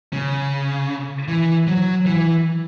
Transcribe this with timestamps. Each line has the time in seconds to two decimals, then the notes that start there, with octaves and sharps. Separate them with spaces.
0.13 C#3
1.28 E3
1.67 F#3
2.05 E3